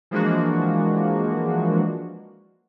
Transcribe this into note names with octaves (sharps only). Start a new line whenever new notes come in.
E3 F3 G#3 A#3 D4 F#4